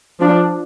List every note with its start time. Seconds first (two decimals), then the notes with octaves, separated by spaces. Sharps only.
0.20 F3 D4